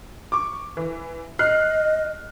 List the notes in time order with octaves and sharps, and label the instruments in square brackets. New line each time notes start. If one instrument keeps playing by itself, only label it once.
[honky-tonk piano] C#6 D6
E3
[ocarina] D#5 [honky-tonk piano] F6 F#6 C7